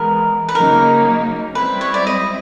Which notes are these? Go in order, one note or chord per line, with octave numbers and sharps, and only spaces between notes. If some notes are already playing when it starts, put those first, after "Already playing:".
Already playing: E3 G#3 B3 A#4
B4
C#3 F#3 A#3 D#4 A#4
G3 C4 E4 B4
C#5
D5
D#5